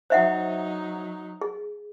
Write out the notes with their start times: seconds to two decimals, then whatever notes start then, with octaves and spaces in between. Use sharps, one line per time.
0.10 F#3 D#4 C5 E5 F#5
1.41 G#4